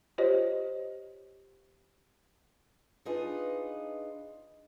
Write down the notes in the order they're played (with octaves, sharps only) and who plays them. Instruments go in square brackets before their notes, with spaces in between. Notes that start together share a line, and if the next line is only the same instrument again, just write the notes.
[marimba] F4 G4 C5 C#5 D#5
[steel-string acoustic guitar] D4 D#4 F4 G#4 B4 D#5